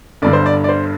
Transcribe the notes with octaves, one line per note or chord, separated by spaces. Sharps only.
G1 G2 D3 D5
C5
D5
D5
C5